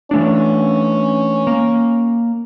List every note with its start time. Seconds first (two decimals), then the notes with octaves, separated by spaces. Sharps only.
0.11 E3 A3 C#4 D4
1.47 A#3